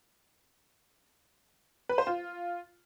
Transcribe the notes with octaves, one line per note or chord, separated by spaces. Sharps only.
B4
C5
F4